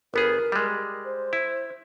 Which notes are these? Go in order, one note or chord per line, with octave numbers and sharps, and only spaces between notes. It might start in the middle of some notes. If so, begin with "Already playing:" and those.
G1 B3 G#4 A#4
G3 G#3
C5
E4